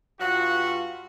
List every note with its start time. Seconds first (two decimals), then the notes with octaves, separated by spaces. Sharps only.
0.20 G2 F4 F#4